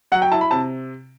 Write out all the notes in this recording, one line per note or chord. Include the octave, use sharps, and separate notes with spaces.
F#3 F#5
G5
E4 A5
B5
C3 A5